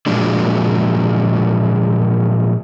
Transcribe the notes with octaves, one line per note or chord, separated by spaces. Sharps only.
A#2 F3 F#3 G#3 D4